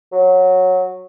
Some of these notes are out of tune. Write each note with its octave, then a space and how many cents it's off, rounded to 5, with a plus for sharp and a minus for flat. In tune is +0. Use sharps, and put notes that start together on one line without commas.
F#3 -10